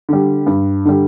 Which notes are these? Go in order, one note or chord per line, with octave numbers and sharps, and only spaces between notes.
D3 G3
G2
D3 G3